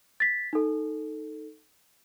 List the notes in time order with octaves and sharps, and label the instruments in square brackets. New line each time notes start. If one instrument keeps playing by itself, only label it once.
[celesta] A6 B6
D#4 A4